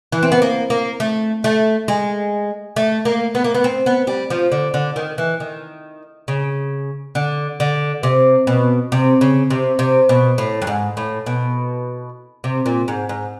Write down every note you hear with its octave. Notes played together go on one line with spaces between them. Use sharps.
E3
C4
B3
A#3
A#3
A3
A3
G#3
A3
A#3
B3
A#3
B3
C4
B3
G3
F3
D3
D3
D#3
E3
D#3
C#3
D3
D3
C3
B2
C3
C#3
C3
C3
B2
A2
G2
G#2
A2
B2
C3
A#2
G#2
G#2